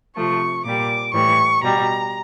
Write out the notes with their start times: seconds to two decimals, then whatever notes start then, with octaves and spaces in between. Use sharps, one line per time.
0.16 C3 F3 A3 C#6
0.65 A#2 G3 D6
1.14 A2 E3 G3 C#6
1.62 B2 G3 A#5